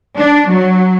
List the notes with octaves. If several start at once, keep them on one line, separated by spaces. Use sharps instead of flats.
D4
F#3